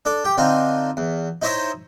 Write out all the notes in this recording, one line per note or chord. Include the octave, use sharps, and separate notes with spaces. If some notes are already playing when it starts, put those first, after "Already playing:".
D4 A4 D5
G4 G5
D3 C4 D4 D#4 F4
E2
D#4 E4 C5 C#5 D#5 E5